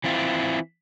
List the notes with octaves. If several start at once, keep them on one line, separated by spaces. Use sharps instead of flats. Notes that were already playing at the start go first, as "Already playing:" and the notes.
E3 C4 E4 F4